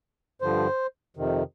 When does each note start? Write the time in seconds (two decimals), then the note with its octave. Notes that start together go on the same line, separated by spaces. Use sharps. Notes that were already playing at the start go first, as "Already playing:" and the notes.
0.41 G2 D3 F3 C5
1.17 F2 C3 D#3